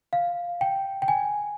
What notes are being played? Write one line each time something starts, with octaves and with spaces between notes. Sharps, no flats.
F5
G5
G5
G#5